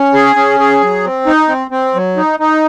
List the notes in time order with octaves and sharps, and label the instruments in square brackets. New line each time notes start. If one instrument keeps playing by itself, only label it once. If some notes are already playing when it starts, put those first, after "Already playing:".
Already playing: [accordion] C#4
G#4
C#4
G#4
F#3
C4
D#4
C4
C4
F#3
D#4
D#4